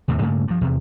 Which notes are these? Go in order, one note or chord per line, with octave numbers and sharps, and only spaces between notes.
D#2 A2 C3
G2 C#3 A3 A#3
G2 F3
E2 C3